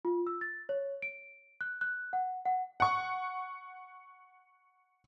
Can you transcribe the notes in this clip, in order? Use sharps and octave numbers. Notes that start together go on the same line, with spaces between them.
F4
E6
A6
C#5
D7
F#6
F#6
F#5
F#5
F#5 C#6